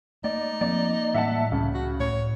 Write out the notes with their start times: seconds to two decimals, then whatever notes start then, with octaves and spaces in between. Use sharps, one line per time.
0.24 A3 A#3 D#4 D5
0.61 F3 A#3 C4 D5
1.14 A2 E3 G3 E5 F#5 A5
1.52 C#2 C#3
1.74 F#4
2.00 A2 C#5